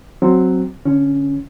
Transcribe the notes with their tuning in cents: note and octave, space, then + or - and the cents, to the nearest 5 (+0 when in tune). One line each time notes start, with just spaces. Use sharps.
F#3 +0 C4 +0
D3 -15 C#4 +5